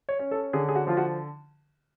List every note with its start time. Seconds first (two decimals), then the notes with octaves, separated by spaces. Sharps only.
0.09 C#5
0.19 C#4
0.31 A4
0.53 D3 G#4
0.69 G#4
0.76 F#4
0.87 F3 F4
0.97 F#4